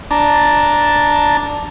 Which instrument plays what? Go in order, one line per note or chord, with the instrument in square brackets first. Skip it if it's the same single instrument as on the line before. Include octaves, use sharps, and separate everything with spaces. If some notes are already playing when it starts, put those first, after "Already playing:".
[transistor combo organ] D4 A5 A#5